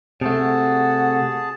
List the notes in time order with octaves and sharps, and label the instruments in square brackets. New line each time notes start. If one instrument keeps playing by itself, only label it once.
[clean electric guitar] C3 A3 [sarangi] F#4 [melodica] G#4 A5